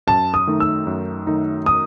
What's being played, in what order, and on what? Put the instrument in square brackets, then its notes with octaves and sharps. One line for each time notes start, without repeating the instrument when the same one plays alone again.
[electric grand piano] F#2 [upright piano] A5
[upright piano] D#6
[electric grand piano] D#3 A3 D#4
[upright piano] E6
[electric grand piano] F#2
D#3 A3 D#4
[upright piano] D#6